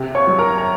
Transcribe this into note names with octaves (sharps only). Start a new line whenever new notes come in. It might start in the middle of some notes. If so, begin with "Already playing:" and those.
Already playing: C3
C#5 C#6
F#3
A#4 A#5
A#5